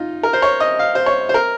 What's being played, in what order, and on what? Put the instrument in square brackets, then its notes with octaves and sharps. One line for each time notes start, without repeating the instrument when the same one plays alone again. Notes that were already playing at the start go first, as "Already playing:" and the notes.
Already playing: [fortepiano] D#4 F4
A#4
C5
C#5
D#5
F5
C5
C#5
C5
A#4